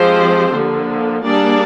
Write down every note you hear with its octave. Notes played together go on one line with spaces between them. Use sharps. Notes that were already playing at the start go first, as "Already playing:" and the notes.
Already playing: F3 G#3 C4 G4 C5
D3 F3 A#3
G3 A#3 D4 G#4 D5